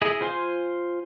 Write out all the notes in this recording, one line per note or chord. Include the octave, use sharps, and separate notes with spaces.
E4 G#4 D#5
F4 C5 G#5 C6